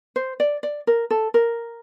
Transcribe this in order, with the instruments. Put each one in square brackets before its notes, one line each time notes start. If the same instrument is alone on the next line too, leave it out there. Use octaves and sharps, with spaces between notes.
[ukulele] C5
D5
D5
A#4
A4
A#4